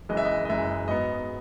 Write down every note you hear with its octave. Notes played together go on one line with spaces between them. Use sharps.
F#1 F#2 E3 G#3 D#5
E5
D#5
D#5
F#1 F#2 E3 G#3 E5
G#2 F#3 B3 D#5